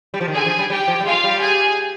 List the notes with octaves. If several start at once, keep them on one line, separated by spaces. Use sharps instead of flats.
G3
F3
D#3
D3 G#4 G#5
F3
G3
G3 G4 G5
F3
G3
G#3 F4 F5
G3
G#4 G#5